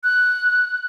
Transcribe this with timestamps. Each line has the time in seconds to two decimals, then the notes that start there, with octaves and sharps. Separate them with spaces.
0.03 F#6